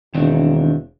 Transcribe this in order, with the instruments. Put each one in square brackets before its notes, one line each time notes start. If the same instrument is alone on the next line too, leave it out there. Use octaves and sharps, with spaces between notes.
[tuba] E1 [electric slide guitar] D#3 C4 D4